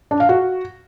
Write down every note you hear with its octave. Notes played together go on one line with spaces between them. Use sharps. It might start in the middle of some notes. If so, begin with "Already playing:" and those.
D4
F5
F#4